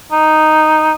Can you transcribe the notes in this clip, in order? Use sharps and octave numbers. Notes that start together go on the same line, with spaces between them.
D#4